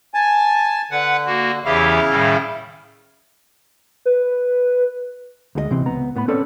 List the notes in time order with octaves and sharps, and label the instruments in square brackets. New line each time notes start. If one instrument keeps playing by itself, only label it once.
[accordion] G#5 A5
[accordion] D3 [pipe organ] B4 F#5
[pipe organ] A#3 F#4
[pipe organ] E2 E3 G4 [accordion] C#3 E4 F5
[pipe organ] A2 D#3 G3
[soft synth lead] B4
[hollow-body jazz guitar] D2 G#3 A4 D#5
C3 E3 C4
C#2 B3 A#5
A2 B3 B4 B5
C4 C#4 A4 B4 C#5 D5